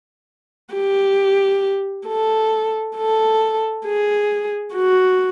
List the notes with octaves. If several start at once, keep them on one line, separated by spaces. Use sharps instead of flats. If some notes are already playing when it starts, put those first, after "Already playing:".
G4
A4
A4
G#4
F#4